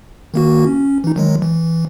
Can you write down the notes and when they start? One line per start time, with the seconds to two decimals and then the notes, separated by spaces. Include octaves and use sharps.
0.34 D#3 A#3 F#4
0.65 C#4
1.04 E3 D#4
1.16 D#3 F#3 G#3
1.42 E3